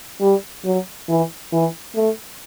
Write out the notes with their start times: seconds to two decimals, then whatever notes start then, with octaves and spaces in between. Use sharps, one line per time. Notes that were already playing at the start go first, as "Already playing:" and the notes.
0.21 G3
0.65 F#3
1.09 E3
1.53 E3
1.96 A3